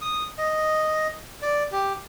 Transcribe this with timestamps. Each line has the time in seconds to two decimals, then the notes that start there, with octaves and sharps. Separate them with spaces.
0.01 D#6
0.38 D#5
1.42 D5
1.72 G4